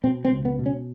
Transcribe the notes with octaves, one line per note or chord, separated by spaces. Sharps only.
B2 C4
C4
C#2
B3
B2
C#4